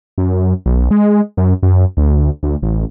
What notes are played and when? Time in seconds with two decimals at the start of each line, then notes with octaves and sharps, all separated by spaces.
0.18 F#2
0.66 B1
0.91 G#3
1.37 F#2
1.63 F#2
1.97 D2
2.43 D2
2.62 A1